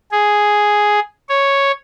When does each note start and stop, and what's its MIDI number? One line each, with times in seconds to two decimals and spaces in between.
0.11 0.99 68
1.29 1.71 73